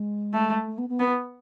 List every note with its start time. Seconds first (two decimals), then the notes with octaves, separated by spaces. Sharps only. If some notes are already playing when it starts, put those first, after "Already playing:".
Already playing: G#3
0.33 A3
0.66 A3
0.78 B3
0.89 B3
0.99 B3